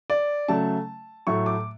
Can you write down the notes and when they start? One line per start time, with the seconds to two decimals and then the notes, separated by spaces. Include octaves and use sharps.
0.10 D5
0.48 C#3 F#3 A3 A5
1.27 A2 F#3 A3 C#6
1.46 D6